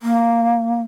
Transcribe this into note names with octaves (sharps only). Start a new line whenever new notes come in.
A#3